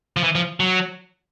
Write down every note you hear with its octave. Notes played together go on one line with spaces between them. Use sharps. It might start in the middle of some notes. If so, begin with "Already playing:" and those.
F3
E3
F3
F#3